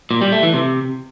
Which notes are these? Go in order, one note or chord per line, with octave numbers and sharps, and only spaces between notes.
A#2
G3
A3
E3
C3